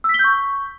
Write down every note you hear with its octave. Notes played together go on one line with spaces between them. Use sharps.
E6
B6
G7
G6
C#6